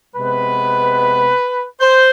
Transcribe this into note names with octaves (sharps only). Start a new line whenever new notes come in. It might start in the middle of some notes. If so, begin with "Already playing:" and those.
C3 G#3 B3 B4
C5